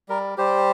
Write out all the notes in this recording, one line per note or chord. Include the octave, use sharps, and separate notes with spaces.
G3 A#4
G3 G4 C5